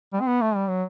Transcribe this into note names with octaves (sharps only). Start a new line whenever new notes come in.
G3
C4
B3
A3
G3
F#3